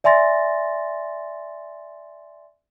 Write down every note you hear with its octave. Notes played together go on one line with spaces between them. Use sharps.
D5 E5 G#5 C6 A6 A#6